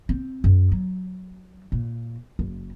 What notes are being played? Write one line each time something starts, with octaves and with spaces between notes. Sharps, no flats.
C4
F#2
F#3
A#2
F#1